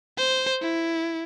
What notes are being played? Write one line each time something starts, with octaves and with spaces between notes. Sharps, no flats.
C5
E4